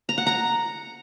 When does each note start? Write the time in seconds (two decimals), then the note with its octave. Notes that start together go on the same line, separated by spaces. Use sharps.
0.09 A#5
0.18 F#5
0.27 A#5